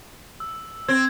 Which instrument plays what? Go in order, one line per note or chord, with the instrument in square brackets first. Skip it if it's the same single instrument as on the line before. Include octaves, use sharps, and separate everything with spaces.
[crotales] E6
[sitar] C4 [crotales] G#6